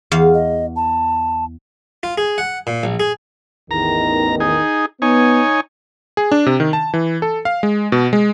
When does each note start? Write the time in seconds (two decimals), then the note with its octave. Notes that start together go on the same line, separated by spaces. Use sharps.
0.12 E2 F5
0.34 D#5
0.76 A5
2.03 F4
2.18 G#4
2.38 F#5
2.67 A#2
2.83 A#1
3.00 G#4
3.71 A1 E2 D#3 A#5
4.40 D#4 G#4
5.02 B3 D#4 C#5 G#5
6.17 G#4
6.32 D4
6.46 C3
6.60 D#3
6.73 A5
6.94 E3
7.22 A4
7.45 F5
7.63 G#3
7.92 B2
8.13 G#3